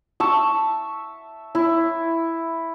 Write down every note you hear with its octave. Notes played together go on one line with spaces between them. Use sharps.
E5 A5 C#6
E4